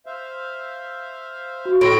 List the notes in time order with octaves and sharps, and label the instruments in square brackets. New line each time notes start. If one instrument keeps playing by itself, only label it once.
[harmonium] C5 E5 F5
[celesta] F#4
[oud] A2 [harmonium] G#3 E4 [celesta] C6 C#6 A#6 [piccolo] D7